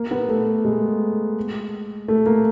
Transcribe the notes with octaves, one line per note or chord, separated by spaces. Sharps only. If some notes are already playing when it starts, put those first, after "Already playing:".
Already playing: A#3
B3
A3
G#3
A3
A#3